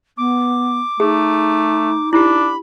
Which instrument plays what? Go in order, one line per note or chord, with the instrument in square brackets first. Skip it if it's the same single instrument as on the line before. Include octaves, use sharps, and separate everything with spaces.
[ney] B3 [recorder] D6
[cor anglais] A3 [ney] D#4 [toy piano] G#4
[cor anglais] D4 [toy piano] E4 G4 [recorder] B5